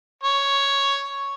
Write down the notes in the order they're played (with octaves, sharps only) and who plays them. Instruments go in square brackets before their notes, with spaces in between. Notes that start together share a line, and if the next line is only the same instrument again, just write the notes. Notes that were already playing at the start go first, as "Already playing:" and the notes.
[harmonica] C#5